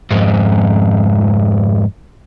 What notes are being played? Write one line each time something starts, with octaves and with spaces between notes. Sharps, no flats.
F2 G#2